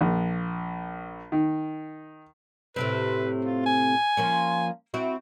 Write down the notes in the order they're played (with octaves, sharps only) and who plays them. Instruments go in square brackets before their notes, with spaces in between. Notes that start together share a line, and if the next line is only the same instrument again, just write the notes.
[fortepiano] A#1
D#3
[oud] A2 C3 C4 [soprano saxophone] B4
[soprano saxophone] F4
G#5
[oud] F3 A#3 C#4
C4 E4 F#4